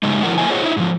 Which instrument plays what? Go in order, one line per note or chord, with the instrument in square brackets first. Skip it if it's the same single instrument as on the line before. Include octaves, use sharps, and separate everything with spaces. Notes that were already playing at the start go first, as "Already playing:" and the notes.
[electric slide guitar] G2 C#3 G#3 D#4
D#3 F3 F#3 E4 A#4 F#5
A3 A#3 E4 C5 D#5 G#5
F4 G#4 C5 C#5 D#5 F#5
D#4 E4
G#2 F3